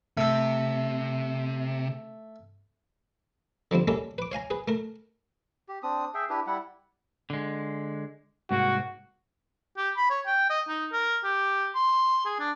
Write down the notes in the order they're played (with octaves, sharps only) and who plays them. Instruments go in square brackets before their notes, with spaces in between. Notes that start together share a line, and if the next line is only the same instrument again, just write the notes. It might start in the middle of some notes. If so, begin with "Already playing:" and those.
[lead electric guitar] C3 [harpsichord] A3 A4
[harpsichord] D3 F3 G3 C4
G3 A#3 C#4 A4 E5
B4 D6
C#5 F5 G#5 A#5
G#4 B4
A3 A#4
[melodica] G4
C4 D4 D#6
G#4 E5 G5
D4 E4 G4 B4
G3 E4 F#5
[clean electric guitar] D3 G#3
[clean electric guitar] C2 G#2 A#3 [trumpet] F#4
[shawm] G4
B5
C#5
G5
D#5
D#4
A#4
G4
C6
G#4
D4